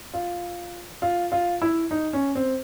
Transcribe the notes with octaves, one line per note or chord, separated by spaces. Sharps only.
F4
F4
F4
E4
D#4
C#4
C4